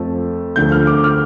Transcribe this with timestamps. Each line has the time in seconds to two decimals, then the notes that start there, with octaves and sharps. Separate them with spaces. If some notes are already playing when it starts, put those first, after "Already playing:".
Already playing: F2 F3 A3
0.56 D2 D3 F3 G6
0.72 F6
0.87 D6
1.04 F6